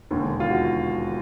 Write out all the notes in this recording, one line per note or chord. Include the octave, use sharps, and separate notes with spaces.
E1 D#2 D3
F4
F#4